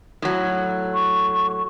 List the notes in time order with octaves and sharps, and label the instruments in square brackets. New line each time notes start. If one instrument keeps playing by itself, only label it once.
[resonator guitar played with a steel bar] A2 F#3
[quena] C#6